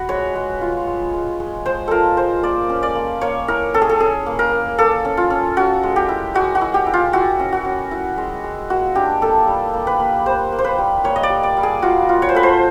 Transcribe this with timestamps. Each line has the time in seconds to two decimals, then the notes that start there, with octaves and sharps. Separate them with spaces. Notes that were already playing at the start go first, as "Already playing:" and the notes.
Already playing: F#4 B4
0.09 G#3 C#5
0.35 G#3
0.61 F4
0.87 G#3
1.13 G#3
1.40 G#3
1.66 G#3 C5
1.88 F4 A4 A#4
2.17 G#3 C5
2.43 A#3 D5
2.69 C#4
2.83 D5
2.95 A#3
3.21 A#3 C#5
3.48 E4 A#4
3.74 C#4 A4
3.82 G#4
3.89 A4
4.00 C#4 G#4
4.26 A#3
4.39 A#4
4.52 A#3
4.78 A#3 A4
5.05 C#4
5.17 F4
5.30 C#4
5.57 C#4 F#4
5.83 G#3
5.96 G4
6.09 E4
6.34 G#3 F#4
6.55 F#4
6.61 E4
6.74 G4
6.86 E4
6.93 F4
7.13 E4 F#4
7.39 C#4
7.52 F#4
7.65 C#4
7.91 E4
8.18 G#3
8.44 G#3
8.70 A#3 F#4
8.95 D4 G4
9.21 A#3 A4
9.47 G3
9.74 A#3
9.87 B4
10.00 A#3
10.26 G3 C5
10.52 A#3
10.59 C5
10.64 B4
10.78 G3
11.04 A#3 C#5
11.16 D#5
11.23 D5
11.30 G3
11.43 D5
11.57 G3
11.63 G#4
11.82 F4 F#4
12.09 F4
12.22 C#5
12.29 C5
12.35 A3 B4
12.43 C5